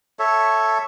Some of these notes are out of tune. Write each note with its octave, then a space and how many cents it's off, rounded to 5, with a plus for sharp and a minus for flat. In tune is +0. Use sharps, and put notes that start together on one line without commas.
A4 +0 C#5 +0 E5 +0